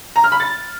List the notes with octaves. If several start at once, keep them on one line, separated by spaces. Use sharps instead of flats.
A#5
F6
B5
A6